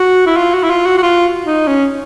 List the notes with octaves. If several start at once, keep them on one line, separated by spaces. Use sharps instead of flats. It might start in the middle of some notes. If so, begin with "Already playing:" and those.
Already playing: F#4
E4
F4
F#4
E4
F4
F#4
F#4
F4
D#4
C#4